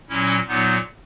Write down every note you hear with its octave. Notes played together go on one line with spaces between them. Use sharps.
A#2 F#3 C#4 E4
A#2 F#3 B3 D#4